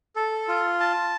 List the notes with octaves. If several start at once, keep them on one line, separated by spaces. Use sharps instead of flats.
A4
F4
A5